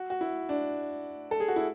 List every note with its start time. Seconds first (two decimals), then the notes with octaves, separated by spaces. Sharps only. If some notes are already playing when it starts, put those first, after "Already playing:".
Already playing: F#4
0.10 F#4
0.21 E4
0.49 D4
1.31 A4
1.40 G#4
1.48 F#4
1.56 E4